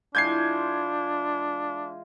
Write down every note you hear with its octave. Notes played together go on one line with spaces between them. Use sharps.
E3 G#3 D4 F4 G6 G#6 C7